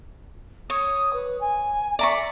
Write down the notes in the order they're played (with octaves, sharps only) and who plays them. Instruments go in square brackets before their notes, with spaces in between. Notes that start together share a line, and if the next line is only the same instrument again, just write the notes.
[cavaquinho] C#5 [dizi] D#6
[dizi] B4
G#5
[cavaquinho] D5 A#5 C#6 [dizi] E5